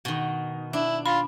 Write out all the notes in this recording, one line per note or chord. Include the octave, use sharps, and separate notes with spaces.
B2 D#3
D4 E4
F4 B5